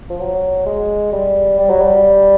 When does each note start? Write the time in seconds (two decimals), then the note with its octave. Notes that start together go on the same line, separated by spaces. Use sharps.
0.10 F3
0.20 F#3
0.66 G#3
1.12 G3
1.59 G3
1.69 F#3
1.81 G3